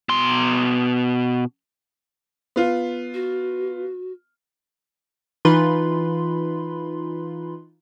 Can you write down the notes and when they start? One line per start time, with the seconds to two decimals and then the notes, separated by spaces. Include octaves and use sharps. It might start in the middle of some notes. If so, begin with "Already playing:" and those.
0.09 B2 C6
2.56 B3 F4
3.14 F#4
5.45 E3 D#4 F4 B4 B5 C6